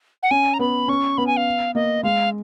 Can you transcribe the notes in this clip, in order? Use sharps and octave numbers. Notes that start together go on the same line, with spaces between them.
F#5
C#4 G#5
A#5
B3 B5
C#4 C#6
B3 B5
G#5
F5
A#3 D#5
G#3 F5